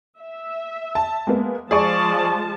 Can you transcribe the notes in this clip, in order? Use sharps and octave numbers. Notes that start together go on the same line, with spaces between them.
E5
A5
G#3 A#3 B3
F3 G#3 G#4 D5 A5 C#6